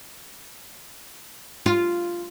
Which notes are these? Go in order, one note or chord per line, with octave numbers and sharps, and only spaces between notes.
F4